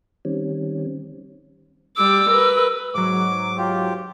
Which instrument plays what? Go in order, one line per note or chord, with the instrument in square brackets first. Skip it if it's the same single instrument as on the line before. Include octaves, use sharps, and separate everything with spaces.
[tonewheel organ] D#3 G3 C4 C#4
[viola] G3 D6 [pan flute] E6
[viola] A#4 B4
[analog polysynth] G#2 F#3 [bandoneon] D6
[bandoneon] F4 G4